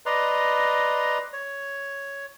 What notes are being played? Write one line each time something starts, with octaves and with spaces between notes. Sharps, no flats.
B4 D5 D#5 A#5 C6
C#5